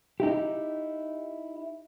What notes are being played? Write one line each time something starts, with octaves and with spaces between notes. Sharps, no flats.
D#4 E4 G4